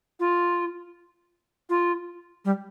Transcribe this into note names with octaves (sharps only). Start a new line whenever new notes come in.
F4
F4
G3